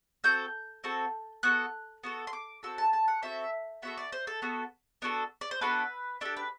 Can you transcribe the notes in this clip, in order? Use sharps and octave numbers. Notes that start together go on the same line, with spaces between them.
C4 F#4 A4 G6
C4 F#4 A4
B3 F#4 A4 F#6
B3 F#4 A4
C6
D6
C4 F#4 A4 E6
A5
A5
F#5
C4 F#4 A4 E5
B3 F#4 A4 E5
D5
C5
A4
B3 F#4 A4
B3 D4 F#4 A4
D5
C5
B3 D4 F#4 A4 B4
D4 G4 A4
B4